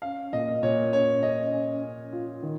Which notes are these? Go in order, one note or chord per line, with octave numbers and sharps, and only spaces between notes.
C#4 F5
A#2 D#5
A#2 C#5
C#4 C#5
C#4 D#5
C#4
C#4
F4
D#3